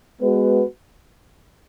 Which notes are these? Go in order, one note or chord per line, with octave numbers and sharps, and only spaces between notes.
G#3 B3 F#4 B4